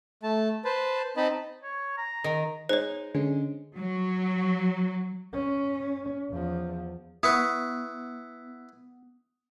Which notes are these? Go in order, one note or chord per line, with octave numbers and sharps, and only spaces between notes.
A3 A5
B4 C5 A5
C4 D#4 D#5 A5 B5
C#5
A#5
D#3
G#3 D#4 C5 C#5
D3 G#3 C#4
F#3
C#4
E2 F3
B3 E4 B4 C#6 D#6